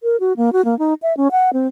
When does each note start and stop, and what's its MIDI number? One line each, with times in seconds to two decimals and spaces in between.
0.03 0.16 70
0.20 0.33 66
0.37 0.53 58
0.53 0.64 66
0.65 0.77 58
0.79 0.94 63
1.02 1.15 76
1.17 1.28 61
1.31 1.50 78
1.53 1.67 60